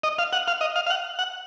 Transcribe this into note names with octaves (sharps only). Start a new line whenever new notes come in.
D#5
F5
F#5
F5
D#5
F5
F5
F#5
F#5